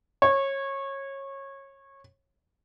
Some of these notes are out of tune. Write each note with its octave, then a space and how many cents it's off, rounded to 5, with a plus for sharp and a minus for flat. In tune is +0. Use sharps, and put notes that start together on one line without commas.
C#5 -20